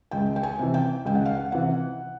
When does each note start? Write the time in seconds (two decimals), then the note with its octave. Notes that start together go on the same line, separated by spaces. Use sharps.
0.11 C#2 G5
0.36 G5
0.43 G#5
0.59 C3 E3
0.74 G5
1.05 C#2 G5
1.15 F#5
1.26 F5
1.35 F#5
1.52 C3 E3 F#5